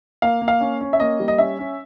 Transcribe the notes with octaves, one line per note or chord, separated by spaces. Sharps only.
A#3 F5
A#3
F5
C#4
C#4
E5
A#3 D#5
G3
D#5
C#4 E5
C#4